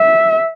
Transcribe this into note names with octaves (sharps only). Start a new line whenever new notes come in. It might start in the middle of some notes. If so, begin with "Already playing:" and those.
Already playing: E5